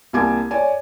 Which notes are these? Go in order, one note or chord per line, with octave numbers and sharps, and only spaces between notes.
C2 A#3 G#5 A5 D6 G#6
C#5 D5 G#5